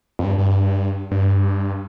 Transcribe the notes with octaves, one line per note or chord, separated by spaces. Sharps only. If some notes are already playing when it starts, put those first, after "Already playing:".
F2
G2
G2
G2